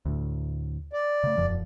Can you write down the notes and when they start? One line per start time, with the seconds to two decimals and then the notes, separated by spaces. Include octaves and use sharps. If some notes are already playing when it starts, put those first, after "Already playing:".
0.05 D2 A2
0.93 D5
1.24 C#3 A3
1.37 E1 F#2 F3